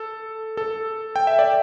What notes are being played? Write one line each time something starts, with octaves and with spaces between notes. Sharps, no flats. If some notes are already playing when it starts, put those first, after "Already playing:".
Already playing: A4
A4
G5
E5
D5